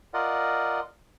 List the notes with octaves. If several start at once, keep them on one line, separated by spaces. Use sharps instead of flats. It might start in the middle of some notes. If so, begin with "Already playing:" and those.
F4 A#4 D5 D#5 F#5